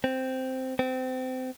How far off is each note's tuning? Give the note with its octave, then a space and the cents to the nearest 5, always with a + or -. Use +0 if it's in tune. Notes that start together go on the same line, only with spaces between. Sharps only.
C4 -5
C4 -25